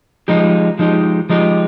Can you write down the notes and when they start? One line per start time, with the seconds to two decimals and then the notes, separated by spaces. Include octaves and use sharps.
0.28 F3 G#3 D#4 G4
0.79 F3 G#3 D#4 G4
1.29 F3 G#3 D#4 G4